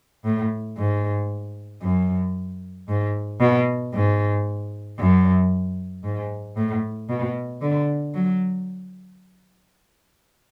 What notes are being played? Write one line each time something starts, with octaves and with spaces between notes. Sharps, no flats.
A2
G#2
F#2
G#2
B2
G#2
F#2
G#2
A2
B2
D3
F#3